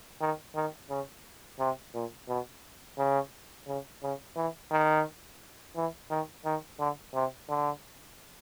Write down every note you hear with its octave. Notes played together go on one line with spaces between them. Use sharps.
D#3
D#3
C#3
C3
A#2
B2
C#3
C#3
C#3
E3
D#3
E3
D#3
D#3
D3
C3
D3